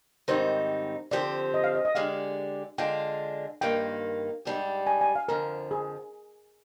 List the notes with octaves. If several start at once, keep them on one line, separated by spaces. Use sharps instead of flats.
G#2 D#3 G3 C4 D#4 C5
D3 F3 C4 G4 C5 D5
D#5
F5
D#5
D#5
D3 G#3 D4 G4 D5 F5
D3 G#3 D4 F4 G5
G2 D#3 A#3 F4 G5
G#2 G3 D4 G4
G#5
G#5
F5
F2 D3 F3 A#4
G#4